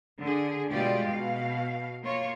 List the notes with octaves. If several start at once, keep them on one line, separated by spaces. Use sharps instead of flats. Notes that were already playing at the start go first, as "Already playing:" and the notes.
D3 G#4
B2 G3 G#3 F4 G4 D5
B2 F5
A#3 F4 C#5